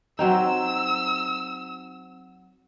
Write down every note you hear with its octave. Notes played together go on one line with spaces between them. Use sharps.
F#3 C4 D#4 E6